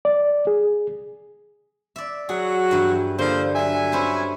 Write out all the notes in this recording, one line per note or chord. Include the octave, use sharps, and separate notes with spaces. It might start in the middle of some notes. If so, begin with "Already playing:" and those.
D5
G#4
D5 E5
F#3 F#4 G#4
G2 E3 G#5
D3 F3 A#3 C5
F#3 E5 G#5
C#4 E4 C5